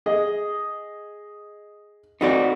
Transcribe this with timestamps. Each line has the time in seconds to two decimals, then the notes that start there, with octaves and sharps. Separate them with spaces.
0.06 G#4 D#5
2.21 C4 D#4 F#4 A4 B4 D5